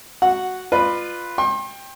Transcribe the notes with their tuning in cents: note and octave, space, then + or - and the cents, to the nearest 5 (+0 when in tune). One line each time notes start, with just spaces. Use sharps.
F#4 +0 F#5 -5
F4 +0 B4 +0 D5 +40
G5 +15 C6 +40